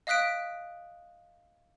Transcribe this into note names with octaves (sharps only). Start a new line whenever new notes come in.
D#5 F5 D#6 F#6 B6 D7